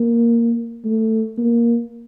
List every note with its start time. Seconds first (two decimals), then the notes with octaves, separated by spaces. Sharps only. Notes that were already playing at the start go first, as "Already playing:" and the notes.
Already playing: A#3
0.85 A3
1.38 A#3